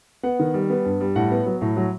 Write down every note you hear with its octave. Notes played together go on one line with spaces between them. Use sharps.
B3 F#5
D#3
G3
B3
G2
G3
A2 F#5
B3
F#3
A2
F#3